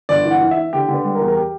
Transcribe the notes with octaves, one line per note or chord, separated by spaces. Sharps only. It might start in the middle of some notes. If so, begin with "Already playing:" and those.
G1 D5
E3
F#5
E3
E5
E3
D3 G4
D3
B4
G3
A#4
E2
A#4
G4